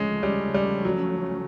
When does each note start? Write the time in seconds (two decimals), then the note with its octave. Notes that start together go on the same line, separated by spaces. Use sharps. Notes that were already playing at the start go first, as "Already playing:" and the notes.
Already playing: D2 C#3 F3 G#3 A3 C#4
0.23 G3
0.54 G3
0.85 F#3